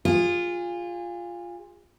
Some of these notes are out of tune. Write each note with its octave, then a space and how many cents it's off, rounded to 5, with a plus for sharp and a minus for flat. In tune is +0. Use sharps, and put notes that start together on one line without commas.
F4 +5 G#4 -30